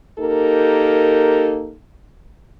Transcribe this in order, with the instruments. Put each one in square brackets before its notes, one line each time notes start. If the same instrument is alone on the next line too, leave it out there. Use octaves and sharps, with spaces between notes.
[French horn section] A#3 D#4 G4 A4 A#4